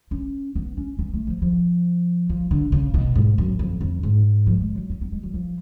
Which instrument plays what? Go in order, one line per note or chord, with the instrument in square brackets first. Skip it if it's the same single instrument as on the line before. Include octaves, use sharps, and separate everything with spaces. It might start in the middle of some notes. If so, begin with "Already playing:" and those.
[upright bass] C#4
B3
C#4
B3
A3
F3
F3
F3
D3
C#3
B2
G#2
F#2
F2
F2
G#2
F3
G#3
F#3
C#4
B3
G#3
F#3
F3